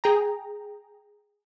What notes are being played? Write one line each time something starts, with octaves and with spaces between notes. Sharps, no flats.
G#4 G5 A#5